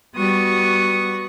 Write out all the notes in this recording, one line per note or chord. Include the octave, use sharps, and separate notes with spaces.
G3 B3 F#4 C#6 D#6